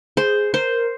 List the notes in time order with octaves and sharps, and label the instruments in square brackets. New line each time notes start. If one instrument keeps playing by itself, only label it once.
[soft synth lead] G#4 [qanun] C5
[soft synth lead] A#4 [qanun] C5